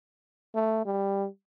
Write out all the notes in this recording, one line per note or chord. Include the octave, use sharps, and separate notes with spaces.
A3
G3